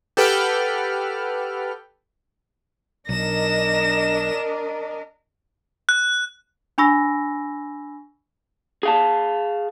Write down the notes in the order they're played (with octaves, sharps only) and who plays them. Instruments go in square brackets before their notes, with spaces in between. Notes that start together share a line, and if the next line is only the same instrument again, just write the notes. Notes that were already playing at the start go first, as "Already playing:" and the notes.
[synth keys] G4 A4 B4 F#5 G5 F6
[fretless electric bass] B1 [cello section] D4 A#4 D#5 [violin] A#6 E7
[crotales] F#6
[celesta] D4 G#5 B5 C#6 E6 A#6
[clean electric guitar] G#4 F5 A5